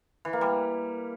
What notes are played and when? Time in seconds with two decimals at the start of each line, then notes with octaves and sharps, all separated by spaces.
0.25 E3
0.33 A#3
0.41 G3